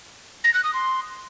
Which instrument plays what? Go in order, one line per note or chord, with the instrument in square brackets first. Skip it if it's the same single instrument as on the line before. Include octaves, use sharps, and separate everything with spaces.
[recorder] A#6
F#6
D#6
C6